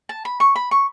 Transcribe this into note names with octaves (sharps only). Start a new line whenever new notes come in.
A5
B5
C#6
B5
C#6